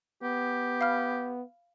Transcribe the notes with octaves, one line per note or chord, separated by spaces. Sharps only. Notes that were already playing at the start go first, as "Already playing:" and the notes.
B3 G4
F5 B5 F6